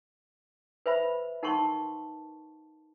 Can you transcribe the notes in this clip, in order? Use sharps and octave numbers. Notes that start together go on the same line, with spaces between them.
B4 C5 E5 B5
D#4 A#4 F#5 A5 C6 C#6